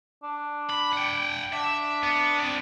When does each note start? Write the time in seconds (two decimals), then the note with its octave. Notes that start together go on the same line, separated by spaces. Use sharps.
0.24 D4
0.69 B5
0.93 F#5 G5
1.53 D4 E5
2.03 B3
2.40 C4 D5